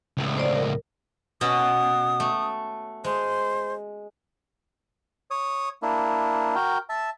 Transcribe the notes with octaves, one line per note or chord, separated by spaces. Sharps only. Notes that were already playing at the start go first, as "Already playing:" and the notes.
C#2 A2
C5 D5
A#4
B2 B3 C#4 D#6
A3
G#3 C5
C#5 D#6
A#3 D4 E4
F#4 A#4 G5
E5 A5